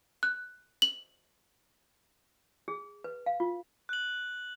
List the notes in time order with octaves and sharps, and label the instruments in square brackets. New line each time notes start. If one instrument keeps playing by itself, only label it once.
[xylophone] F#6
F#7
[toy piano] G#4
B4
F5
F4
[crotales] F#6 F#7